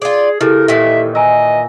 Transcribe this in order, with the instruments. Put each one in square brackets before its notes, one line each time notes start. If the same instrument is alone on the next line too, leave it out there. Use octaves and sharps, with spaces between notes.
[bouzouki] F4 D5 [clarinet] G#4
[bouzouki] C#3 [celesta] E4 G4 A4 [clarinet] A#4
[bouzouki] A#2 D#3 E3 [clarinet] E5
[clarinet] D#5 [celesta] G#5 A#5 E6